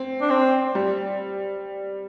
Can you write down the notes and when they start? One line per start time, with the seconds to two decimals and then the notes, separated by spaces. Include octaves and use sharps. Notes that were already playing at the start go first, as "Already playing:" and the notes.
Already playing: C4
0.21 D4
0.30 C4
0.75 G3